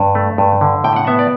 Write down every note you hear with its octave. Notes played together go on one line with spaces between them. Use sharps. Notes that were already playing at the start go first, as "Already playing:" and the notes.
Already playing: G2
A3
G2
D3
A2 G5
F#5
B3 E5
D5